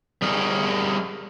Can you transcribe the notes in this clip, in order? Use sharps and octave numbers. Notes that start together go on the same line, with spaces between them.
G3 G#4 A#4